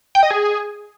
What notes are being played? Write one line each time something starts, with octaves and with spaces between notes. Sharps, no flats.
G5
D#5
G#4